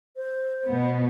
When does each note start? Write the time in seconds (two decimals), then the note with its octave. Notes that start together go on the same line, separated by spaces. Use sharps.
0.16 C5
0.66 B2 B3